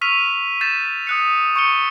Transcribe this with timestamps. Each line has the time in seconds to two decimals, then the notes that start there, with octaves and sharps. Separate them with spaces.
0.01 C#6 E6 F6 B6 D#7 F7
0.61 G6 A6 B6 E7
1.07 D#6 F#6 C#7
1.56 C#6 G6 C#7 D#7 G7